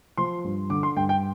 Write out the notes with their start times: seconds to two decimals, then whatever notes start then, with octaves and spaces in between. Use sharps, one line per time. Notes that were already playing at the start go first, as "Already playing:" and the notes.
0.17 F3 C6
0.44 G2
0.70 D3 D6
0.83 C6
0.96 G2 G5
1.09 G5